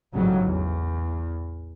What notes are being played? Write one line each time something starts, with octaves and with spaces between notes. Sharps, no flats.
A1 F2 G#2 C#3 F#3 G3
E2